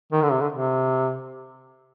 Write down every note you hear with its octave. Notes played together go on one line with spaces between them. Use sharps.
D#3
D3
C3
D3
C3